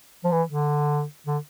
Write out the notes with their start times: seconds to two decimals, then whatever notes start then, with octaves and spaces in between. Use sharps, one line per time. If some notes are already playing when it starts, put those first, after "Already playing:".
0.24 F3
0.32 E3
0.48 D3
1.27 D3